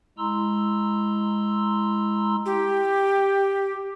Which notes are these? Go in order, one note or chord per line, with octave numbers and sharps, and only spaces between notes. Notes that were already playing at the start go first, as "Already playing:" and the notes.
G#3 E4 A#5 C6 E6
G4